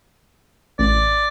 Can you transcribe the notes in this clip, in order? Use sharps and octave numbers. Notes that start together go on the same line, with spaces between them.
A1 D5